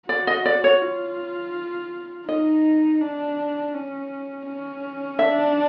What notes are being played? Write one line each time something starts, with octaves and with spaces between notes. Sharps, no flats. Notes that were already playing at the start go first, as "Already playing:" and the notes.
F#4 D5
D#5
D5
C#5
F4
D#4 D#5
D4
C#4
C#4
D4 E5